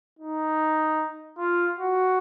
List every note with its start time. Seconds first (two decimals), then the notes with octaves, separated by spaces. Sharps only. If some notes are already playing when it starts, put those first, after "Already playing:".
0.19 D#4
1.38 F4
1.78 F#4